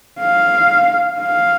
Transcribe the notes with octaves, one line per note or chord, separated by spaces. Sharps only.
F5
F5